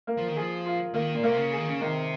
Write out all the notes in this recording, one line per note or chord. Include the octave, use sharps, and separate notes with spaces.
A#3
F3
D#3
F3 G#4
F4
D#3 A#3
A#2
C3 A#3
C#3
D#3 G#4
C#3
C3 D#3